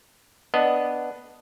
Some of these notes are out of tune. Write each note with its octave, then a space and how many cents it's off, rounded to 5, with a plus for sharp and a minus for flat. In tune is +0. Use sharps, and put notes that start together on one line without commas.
B3 +0 D4 +0 D#5 +0